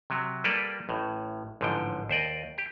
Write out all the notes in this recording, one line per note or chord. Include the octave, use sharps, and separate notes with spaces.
C3 F#3
G3 A#3 G4 A4 B4 D5
A1 A2
A1 G#2 D3 F3 G5
D#2 C5 D5 D#5
G4